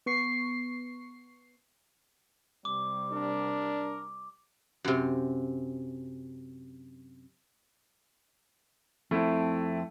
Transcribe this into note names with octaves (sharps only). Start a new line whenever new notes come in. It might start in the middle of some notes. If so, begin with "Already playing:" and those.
B3 C#6 C7
C3 G3 D6
D4 A#4
F#2 C3
F2 A3 C4 E4